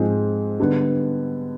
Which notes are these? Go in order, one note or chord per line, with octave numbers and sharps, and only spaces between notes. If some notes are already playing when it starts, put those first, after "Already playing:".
Already playing: G#2 F3 C4 F4 G#4
D3 G3 B3